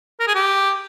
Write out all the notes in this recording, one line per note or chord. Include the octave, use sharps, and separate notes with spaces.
A#4
G#4
G4